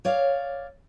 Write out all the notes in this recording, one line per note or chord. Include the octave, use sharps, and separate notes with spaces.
C#5 D5 F5